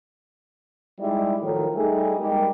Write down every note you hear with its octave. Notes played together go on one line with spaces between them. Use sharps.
G3 G#3 D#4 E4 D5
A2 D#3 F3 F#3
G3 A3 D#4 G#4
G3 G#3 A#3 D#4 G4